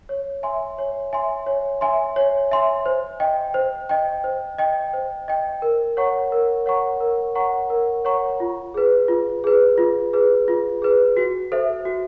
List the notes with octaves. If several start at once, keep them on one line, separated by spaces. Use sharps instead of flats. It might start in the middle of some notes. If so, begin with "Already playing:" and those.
C#5
E5 G#5 C6
C#5
E5 G#5 C6
C#5
E5 G#5 C6
C#5
E5 G#5 C6
C5
D#5 G5
C5
D#5 G5
C5
D#5 G5
C5
D#5 G5
A#4
C#5 F#5 A#5 C#6
A#4
C#5 F#5 A#5 C#6
A#4
C#5 F#5 A#5 C#6
A#4
C#5 F#5 A#5 C#6
F4
G#4 B4
F4
G#4 B4
F4
G#4 B4
F4
G#4 B4
F#4
A4 C5 E5
F#4